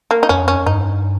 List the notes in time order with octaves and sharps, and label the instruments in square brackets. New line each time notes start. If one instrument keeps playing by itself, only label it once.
[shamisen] A#3
D#4
[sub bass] F2 [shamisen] C#4
[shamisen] C#4
[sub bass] G2 [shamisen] D#4